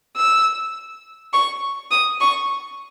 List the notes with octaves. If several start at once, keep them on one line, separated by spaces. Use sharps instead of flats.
E6
C#6
D#6
C#6